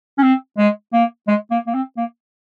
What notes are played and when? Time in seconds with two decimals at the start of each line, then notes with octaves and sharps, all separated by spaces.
0.18 C#4
0.23 C4
0.58 G#3
0.93 A#3
1.28 G#3
1.51 A#3
1.67 A#3
1.74 C4
1.97 A#3